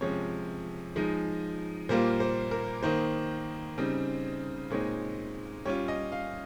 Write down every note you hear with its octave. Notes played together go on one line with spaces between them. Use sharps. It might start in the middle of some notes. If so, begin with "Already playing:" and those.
C3 F3 G#3 C#4 C#5
F3 G#3 D#4
A#2 G3 A#3 F4 C5
C5
A#4
D#3 A#3 D#4 C5
C#3 G3 C4 D#4
A#2 G#3 C4 D#4 C#5
G3 C#4 F4 C#5
D#5
F5